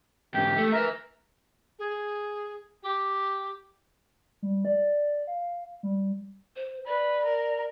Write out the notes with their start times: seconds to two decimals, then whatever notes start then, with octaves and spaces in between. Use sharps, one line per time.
0.34 E2 G#2 G4
0.57 A3
0.72 A#4 B4 E5
1.79 G#4
2.83 G4
4.42 G3
4.65 D5
5.27 F5
5.83 G3
6.56 C5
6.86 B4 D5
7.25 A#4